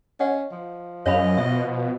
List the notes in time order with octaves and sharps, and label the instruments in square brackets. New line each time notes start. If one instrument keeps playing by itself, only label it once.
[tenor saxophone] C#4 [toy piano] D#5 F#5
[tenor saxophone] F3
[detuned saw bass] F#2 [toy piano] C#5 F5 B5 [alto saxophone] D#5
[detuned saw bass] B2 [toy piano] E5